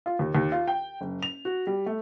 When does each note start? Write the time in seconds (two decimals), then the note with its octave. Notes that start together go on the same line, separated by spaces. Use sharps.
0.06 F4
0.19 D#2
0.35 D#2
0.52 F4
0.68 G5
1.01 F#1
1.23 F7
1.45 F#4
1.67 G3
1.86 A3